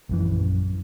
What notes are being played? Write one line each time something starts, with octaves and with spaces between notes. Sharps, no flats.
A#1 F#2 E3